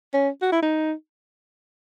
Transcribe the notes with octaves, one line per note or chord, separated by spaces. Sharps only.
C#4
F#4
E4
D#4